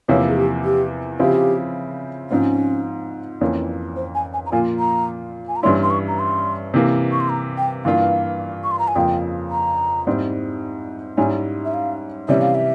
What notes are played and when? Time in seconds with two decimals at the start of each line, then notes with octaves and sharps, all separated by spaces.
0.08 E2 C3 F3 A#3 E4 C#5
0.28 G#4
0.36 G4
0.65 G4
1.19 C#3 F3 C4 E4 G4
2.30 G#2 F3 C4 C#4 F4
3.41 F2 E3 A#3 C#4
3.96 C5
4.15 G#5
4.34 G#5
4.46 A#5
4.52 A#2 F3 A#3 F4 G#5
4.79 A#5
5.48 G#5
5.56 A#5
5.63 G2 E3 G3 C#4 E4 C6
5.83 C6
5.90 C#6
6.08 A#5
6.19 C6
6.74 C3 E3 A#3
7.12 C#6
7.20 C6
7.30 A#5
7.58 G5
7.85 G2 E3 A#3 F4 F5
8.64 C#6
8.71 C6
8.79 A#5
8.88 G#5
8.96 F2 C#3 F3 A#3 G5
9.51 A#5
10.07 G#2 G3 C4 E4
11.17 G#2 G3 C#4 E4 G#5
11.65 E5
11.74 F5
12.29 C3 E3 G3 C#4 E5
12.41 F5
12.55 E5